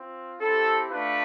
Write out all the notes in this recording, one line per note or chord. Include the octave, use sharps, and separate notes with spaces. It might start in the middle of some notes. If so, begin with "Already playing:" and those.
Already playing: C4 F4
C4 E4 G4 A4
A3 D4 F4 B4